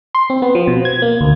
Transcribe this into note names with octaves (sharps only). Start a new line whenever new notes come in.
C6
C4
B3
F3
B2
G#6
A#3
D2